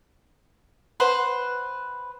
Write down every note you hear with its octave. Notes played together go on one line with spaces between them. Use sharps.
B4 C5 F#5